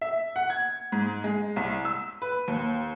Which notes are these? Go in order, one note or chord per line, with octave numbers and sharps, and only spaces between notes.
E5
F#5
G#6
G#2
G#3
C2
E6
B4
D#2